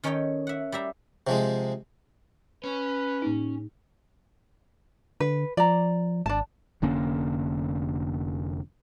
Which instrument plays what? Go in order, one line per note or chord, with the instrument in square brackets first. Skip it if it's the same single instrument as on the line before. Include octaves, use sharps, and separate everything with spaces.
[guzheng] D#3 C#4 D#4 A4 C#5 G5
E5 F#5
G3 G4 E5 A#5
[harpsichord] C3 F3 G#3
[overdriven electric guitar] C#4 [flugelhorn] B4
[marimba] A2 A#3 D#4
[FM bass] D3 [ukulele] B4
[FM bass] F3 [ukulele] D5 A#5
[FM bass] G#1 [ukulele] D4 A5
[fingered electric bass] F1 D3 A#3 C#4